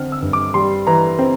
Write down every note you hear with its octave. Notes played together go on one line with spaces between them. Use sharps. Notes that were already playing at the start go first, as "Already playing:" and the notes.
Already playing: D3 C4 F6
E6
G2
D6
G3 C6
E3 A#5
C4